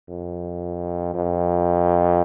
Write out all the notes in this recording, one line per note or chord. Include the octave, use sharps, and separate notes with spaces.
F2
F2